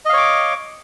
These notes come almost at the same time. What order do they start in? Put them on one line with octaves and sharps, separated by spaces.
D#5 F5 C#5 D6